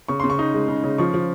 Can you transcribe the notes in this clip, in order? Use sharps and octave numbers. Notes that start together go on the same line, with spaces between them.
C#3 C#6
C#3 C6
C#6
D#4
G#3
C#3
C#3
F3 C#6
F3